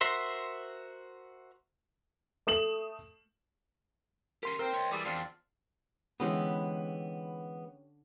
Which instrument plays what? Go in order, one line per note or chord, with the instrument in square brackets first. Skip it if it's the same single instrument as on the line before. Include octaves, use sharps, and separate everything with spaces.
[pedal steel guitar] F#4 A#4 C5 E5 C6
[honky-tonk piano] A3 D#6 E7 F#7
[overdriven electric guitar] C#4 G4 [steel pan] A#4 C6
[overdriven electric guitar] C4 [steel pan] A#4 [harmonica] C5 G5
[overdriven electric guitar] C#5 D#5
[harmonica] E3 G#4 D5 [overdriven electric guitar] G3
[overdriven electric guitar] E2 [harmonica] C4 D4 F4
[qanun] D3 C#4 G4 [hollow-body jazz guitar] E3 G#3 B3